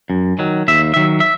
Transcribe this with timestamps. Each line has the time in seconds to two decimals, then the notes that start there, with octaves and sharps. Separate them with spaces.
0.10 F#2
0.39 D#3 F#3
0.68 D#2 E5
0.94 D#3 F#3 E5
1.20 E5